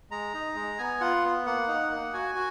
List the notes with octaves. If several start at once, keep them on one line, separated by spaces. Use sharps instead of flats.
G#3 A#5
D#4
G#3
B3 G#5
F4 F#5
B3
A#3 F#5
D#4
A#3
F#4 G#5
F#4